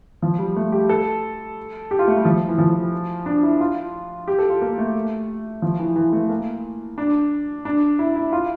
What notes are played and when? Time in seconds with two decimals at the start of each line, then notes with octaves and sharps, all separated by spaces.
0.22 F3
0.39 G3
0.56 A3
0.72 G4
0.89 A4
1.91 G4
1.99 F4
2.08 A3
2.17 G3
2.25 F3
2.48 E3
2.58 F3
3.26 D4
3.43 E4
3.60 F4
4.28 G4
4.39 A4
4.50 F4
4.61 A#3
4.78 A3
5.62 F3
5.79 E3
5.96 E3
6.13 A3
6.29 A#3
6.98 D4
7.65 D4
7.99 E4
8.16 E4
8.33 F4